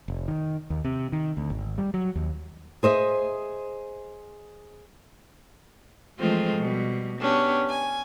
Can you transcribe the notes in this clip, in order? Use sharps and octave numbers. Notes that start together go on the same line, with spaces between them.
F1
D#3
D#2
C3
D#3
D2
G#1
G3
F#3
D#2
G#4 C5 D#5 E5
E3 F3 G#3 A3 C4 F4
B2 G3
B3 C#4 D4 G4
G#5